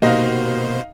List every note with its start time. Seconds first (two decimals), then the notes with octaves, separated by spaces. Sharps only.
0.02 B2 A#3 D#4 F#4 G4 C5 D#5 F5